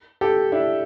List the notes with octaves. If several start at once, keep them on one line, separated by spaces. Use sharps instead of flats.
G4 A4
D4 E4